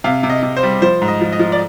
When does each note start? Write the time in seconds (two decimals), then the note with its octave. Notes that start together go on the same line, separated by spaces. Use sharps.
0.04 C3 F5
0.23 C3
0.30 D#5
0.43 C3
0.57 C5
0.63 G3
0.82 F3 C5
1.02 G#2
1.08 D#5
1.21 F3
1.33 D#5
1.39 F3
1.52 D5